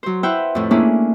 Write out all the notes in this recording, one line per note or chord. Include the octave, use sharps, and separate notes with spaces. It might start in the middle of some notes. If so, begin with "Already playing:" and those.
F#3 C5
E4 B4 C5 E5 F#5 G5
F2 A2
A3 A#3 C#4 D4 E4 G#4